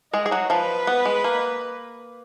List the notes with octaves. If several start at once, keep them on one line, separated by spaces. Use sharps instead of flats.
G#3 G#4 D#5
G#4
F#3 F#4
F3 F4 B4
B3
G#3
A#3